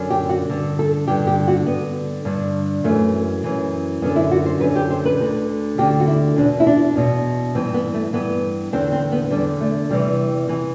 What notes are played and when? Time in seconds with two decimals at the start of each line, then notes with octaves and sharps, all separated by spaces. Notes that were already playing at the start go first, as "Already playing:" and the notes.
Already playing: F#2 D3
0.10 G4
0.30 F#4
0.49 G2 D3
0.79 A4
1.07 G2 D3 G4
1.27 G4
1.48 F#4
1.67 G2 D3 B3
2.25 G2 D3
2.84 F#2 E3 A3
3.44 F#2 E3
4.02 F#2 B3
4.06 D3
4.16 E4
4.31 F#4
4.46 C5
4.60 F#2 D3 B4
4.76 G4
4.90 C5
5.05 B4
5.20 D2 D3
5.78 D2 D3 G4
6.00 F#4
6.08 E4
6.36 E2 B2 D4
6.60 E4
6.67 D4
6.96 E2 B2
7.55 G2 E3 C4
7.74 B3
7.94 A3
8.13 G2 E3 B3
8.73 E2 D3 C4
8.92 C4
9.12 B3
9.31 D3 G3
9.36 E2
9.61 A3
9.90 E2 C3 E3 G3
10.49 C3 E3